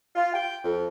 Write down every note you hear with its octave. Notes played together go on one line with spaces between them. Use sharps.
F4
G5
F2